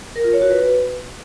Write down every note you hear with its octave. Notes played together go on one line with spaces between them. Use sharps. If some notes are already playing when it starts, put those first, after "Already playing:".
A#4
F4
C#5
F#4
B4